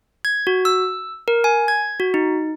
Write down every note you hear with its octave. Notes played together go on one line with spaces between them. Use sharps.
G#6
F#4
E6
A#4
G#5
G#6
F#4
D#4